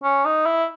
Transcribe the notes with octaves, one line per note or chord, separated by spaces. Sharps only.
C#4
D#4
E4